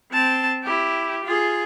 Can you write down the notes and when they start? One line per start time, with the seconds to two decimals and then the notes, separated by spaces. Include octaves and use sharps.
0.12 C4 A5
0.64 E4 G4
1.24 F4 G#4